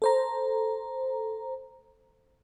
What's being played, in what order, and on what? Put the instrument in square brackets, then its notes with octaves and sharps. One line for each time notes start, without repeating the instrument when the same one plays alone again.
[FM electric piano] A4 C5 A#5